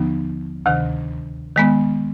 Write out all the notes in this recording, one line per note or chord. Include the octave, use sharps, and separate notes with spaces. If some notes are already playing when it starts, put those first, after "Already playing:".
Already playing: D#2 D3 F3 B3 D#4
D2 C3 D#3
D#3 G#3 B3